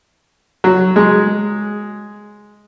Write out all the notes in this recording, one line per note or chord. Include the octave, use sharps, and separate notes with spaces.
F#3
G#3